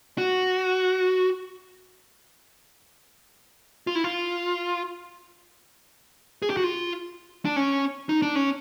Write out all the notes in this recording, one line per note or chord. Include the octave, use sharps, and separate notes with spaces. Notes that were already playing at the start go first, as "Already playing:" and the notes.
F#4
F4
E4
F4
G#4
G4
F#4
F4
D4
C#4
D#4
D4
C#4